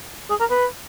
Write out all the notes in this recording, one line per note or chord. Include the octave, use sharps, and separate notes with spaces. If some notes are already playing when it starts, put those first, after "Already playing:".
G#4
A#4
B4